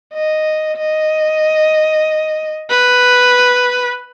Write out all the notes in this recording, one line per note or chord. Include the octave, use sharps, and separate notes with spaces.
D#5
D#5
B4